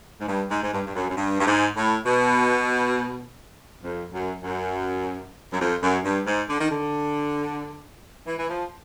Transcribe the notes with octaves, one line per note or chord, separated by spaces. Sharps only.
G#2
G2
G#2
G#2
G2
G2
F#2
F#2
G2
G2
G#2
A2
B2
F2
F#2
F#2
F#2
F2
F#2
G2
G#2
D3
D#3
D3
E3
E3
F3